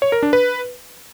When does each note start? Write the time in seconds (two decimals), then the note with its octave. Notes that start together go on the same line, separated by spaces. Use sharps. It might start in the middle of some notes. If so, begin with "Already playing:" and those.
0.02 C#5
0.12 A#4
0.23 D4
0.33 B4